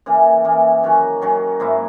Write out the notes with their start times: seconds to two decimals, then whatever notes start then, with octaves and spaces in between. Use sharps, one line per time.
0.06 C#3 E3 A#3
0.45 C#3 E3 A#3
0.83 D#3 F#3 C#4 F#4
1.22 D#3 F#3 C#4 F#4
1.60 G#2 F#3 A#3 E4